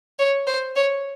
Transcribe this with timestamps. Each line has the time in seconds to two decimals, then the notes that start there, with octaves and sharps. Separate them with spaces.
0.19 C#5
0.47 C5
0.76 C#5